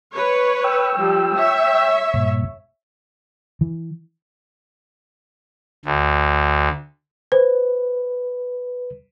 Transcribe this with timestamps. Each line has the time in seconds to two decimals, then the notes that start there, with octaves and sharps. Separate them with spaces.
0.14 B4 C#5
0.64 G5 E6
0.98 F3 G3
1.36 C#5 E5
2.14 G2 A#2
3.61 E3
5.85 D2
7.32 B4 C5